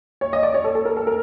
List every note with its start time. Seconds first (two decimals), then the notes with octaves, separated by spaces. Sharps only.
0.21 C#5
0.33 D#5
0.43 D5
0.54 C#5
0.64 A4
0.75 A4
0.85 A#4
0.97 A4
1.07 A#4